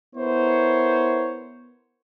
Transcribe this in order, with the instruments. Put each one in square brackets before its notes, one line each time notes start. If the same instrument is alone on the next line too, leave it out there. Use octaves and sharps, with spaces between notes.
[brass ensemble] B3 E4 A#4 C5 C#5